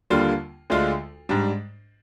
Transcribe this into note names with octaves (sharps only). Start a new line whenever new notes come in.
D#2 D3 G3 A#3 F4
D2 D3 G#3 D4 F4
G#2 G3 D4